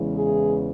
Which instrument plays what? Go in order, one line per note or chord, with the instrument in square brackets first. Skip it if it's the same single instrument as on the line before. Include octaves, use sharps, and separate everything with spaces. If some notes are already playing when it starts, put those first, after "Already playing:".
Already playing: [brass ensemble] E2 C#3 E3 G#3
G#4